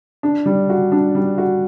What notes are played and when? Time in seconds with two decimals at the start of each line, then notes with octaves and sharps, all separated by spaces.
0.23 D4
0.46 G3
0.69 F#4
0.92 D4
1.15 G3
1.38 F#4